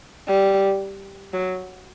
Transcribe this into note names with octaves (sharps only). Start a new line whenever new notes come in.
G3
F#3